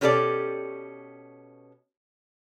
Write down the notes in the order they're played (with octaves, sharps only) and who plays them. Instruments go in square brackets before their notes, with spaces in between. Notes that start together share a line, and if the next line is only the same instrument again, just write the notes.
[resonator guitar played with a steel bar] B2 C#4 G4 A4 C#5 D5